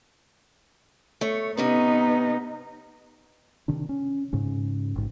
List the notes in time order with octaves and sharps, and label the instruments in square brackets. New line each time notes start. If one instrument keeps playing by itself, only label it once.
[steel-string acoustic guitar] A3 C#5
[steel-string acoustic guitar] C3 C#4 B4 [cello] B3 D#4
[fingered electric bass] C3 D#3 D4
C#4
G#2 C#3 C#4
A1 G#2